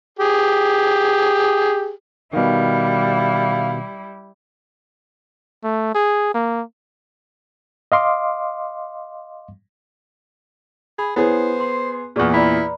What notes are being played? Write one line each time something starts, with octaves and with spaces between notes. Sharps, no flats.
G4 G#4
B2 D#3 G3 E4 F5
A3
G#4
A#3
D#5 F5 C6 D6
G#4 B5
B3 E4 G#4 C5 C#5
C6 C7
E2 A#2 G#4 D5 C#6
E4 D5 A#5 B5